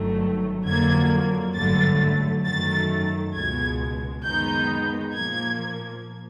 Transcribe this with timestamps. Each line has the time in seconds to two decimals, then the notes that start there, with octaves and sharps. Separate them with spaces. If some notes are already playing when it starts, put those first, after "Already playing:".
Already playing: G1 G2 D#3 F#3 A3
0.66 F2 D3 F#3 A#3 G#6
1.55 G#1 G2 D3 F#3 A3 A6
2.45 F#2 D#3 F#3 A3 A6
3.34 C#2 B2 G#3 G#6
4.24 F#2 D#3 G#3 B3 D#4 G6
5.14 A#2 F3 A#3 G#6